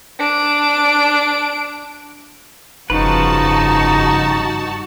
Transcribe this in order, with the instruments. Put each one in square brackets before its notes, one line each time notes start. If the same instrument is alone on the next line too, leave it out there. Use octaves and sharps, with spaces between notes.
[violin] D4 D7
[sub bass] F1 [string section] G2 F#4 A5 [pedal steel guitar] C#3 F3 B4 [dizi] D#4